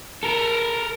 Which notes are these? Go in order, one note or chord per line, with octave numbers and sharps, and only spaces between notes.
A4 A#4